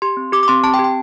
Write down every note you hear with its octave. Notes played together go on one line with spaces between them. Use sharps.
G4 C6
C4
G4 D6
D6
C4 C6
C4 A5
G5
G4
G5